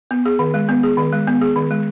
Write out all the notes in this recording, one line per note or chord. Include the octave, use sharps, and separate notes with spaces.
B3
G#4
D#3
G#3
B3
G#4
D#3
G#3
B3
G#4
D#3
G#3